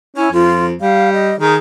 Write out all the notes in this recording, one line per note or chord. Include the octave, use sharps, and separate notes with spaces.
C#4 E4
F2 F4
G3 F5
D#5
D#3 G#4